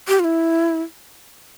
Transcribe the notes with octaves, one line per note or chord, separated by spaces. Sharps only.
G4
F4
E4